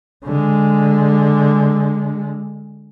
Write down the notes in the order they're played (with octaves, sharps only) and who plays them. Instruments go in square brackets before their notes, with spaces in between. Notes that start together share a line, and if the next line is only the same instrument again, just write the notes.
[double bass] D3 G#3